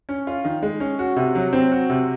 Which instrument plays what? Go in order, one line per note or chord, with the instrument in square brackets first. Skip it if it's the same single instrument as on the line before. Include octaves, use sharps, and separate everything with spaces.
[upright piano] C#4
F4
D#3
G#3
C#4
F#4
C3
F#3
C4
F#4
C3